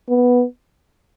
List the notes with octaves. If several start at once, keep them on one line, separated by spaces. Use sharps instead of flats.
B3